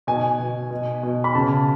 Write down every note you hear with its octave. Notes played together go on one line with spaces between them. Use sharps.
B2 G#5
B2
B2
B2
B5
C#3 A5